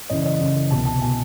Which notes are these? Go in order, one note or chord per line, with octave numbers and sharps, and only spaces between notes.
F#2 C#3 E3 D#5
D5
D#5
F#2 C#3 E3
C2 B2 A5
A5
B2 G#5